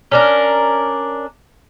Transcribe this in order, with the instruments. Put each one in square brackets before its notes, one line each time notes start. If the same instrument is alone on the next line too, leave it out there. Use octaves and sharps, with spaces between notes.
[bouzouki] C#4 D4 A#4